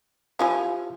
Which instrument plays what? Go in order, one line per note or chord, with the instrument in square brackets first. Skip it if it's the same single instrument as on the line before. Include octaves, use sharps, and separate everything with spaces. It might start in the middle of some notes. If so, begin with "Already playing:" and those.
[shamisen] F3 E4 G#5 [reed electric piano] F4 G4